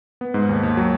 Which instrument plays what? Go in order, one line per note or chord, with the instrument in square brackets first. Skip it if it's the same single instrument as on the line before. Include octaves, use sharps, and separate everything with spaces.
[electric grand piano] B3
G#2
D#2
D#2
F#3